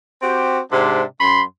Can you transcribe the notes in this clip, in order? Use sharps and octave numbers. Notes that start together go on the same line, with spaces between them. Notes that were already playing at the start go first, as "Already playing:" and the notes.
C4 F#4 G4
G#2 C3 D4
F#2 B5 C6